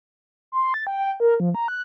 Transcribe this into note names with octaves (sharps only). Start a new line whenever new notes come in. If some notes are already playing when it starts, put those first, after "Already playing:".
C6
A6
G5
A#4
F3
A#5
F#6